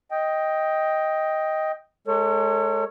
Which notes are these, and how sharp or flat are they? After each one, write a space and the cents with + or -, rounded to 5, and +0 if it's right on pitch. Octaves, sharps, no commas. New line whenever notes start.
D#5 +10 G5 +0
G#3 +25 A4 +45 C#5 +0